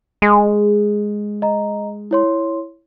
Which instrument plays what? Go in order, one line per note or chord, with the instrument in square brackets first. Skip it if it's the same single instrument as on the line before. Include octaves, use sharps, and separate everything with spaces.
[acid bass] G#3 [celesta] G#4
[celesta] D#5 A#5
E4 C#5 C6